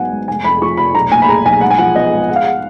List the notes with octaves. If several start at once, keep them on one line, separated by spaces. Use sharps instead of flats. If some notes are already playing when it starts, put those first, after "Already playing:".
Already playing: G#1 F#3 B3 D#4 F#5 G#5
G#2
F1 G#5
F2 B5
F3 C#6
F1 B5
B1 A#5
A#2 G#5
B5
G#3 A#5
B1 G#5
G#2 F#5
G#5
F3 F#5
B3 D#5
G#2
G#3 F#5
F5
F#5